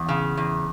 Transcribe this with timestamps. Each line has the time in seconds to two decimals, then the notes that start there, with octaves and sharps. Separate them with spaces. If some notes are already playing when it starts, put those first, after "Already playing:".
Already playing: E2
0.09 C#3
0.37 E2